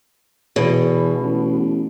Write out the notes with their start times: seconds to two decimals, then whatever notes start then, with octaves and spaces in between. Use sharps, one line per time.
0.56 E2 B2
1.19 A1